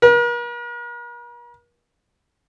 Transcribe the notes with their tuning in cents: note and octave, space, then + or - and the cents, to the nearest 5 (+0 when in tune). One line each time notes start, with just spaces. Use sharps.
A#4 +45